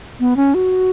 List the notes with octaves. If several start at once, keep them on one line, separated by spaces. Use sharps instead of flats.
B3
C#4
F#4